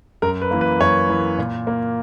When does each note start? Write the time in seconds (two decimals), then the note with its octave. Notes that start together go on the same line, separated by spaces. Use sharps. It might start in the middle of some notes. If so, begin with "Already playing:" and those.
0.22 F#2 A#4
0.42 B4
0.51 E3 A#3
0.61 B4
0.80 F#2 C#5
1.09 E3 A#3
1.38 A#2
1.67 A#3